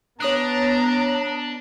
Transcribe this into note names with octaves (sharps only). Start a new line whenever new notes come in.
B3 D4 C#5 A#5 D#6 F#6